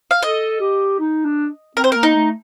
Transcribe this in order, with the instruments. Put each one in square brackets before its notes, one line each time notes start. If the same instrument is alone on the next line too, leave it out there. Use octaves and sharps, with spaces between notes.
[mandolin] F5
[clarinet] A4 [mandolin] D#5
[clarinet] G4
D#4
D4
[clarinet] C4 [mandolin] A#4
[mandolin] C5
[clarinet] A#3 [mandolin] A#4
[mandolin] D#4
[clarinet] A3